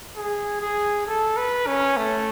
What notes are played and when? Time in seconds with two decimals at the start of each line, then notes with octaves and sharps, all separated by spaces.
0.17 G#4
0.62 G#4
1.07 A4
1.37 B4
1.67 C#4
1.97 A3